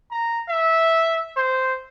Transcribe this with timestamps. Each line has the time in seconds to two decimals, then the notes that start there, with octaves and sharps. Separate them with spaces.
0.11 A#5
0.49 E5
1.37 C5